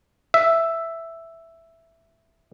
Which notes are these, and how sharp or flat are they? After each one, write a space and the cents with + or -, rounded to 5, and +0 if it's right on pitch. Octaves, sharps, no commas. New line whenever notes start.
E5 +5